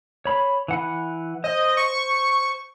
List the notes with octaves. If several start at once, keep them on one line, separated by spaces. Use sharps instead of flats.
C#5 B5
E3 F#5 B5
C5 D#5
C#6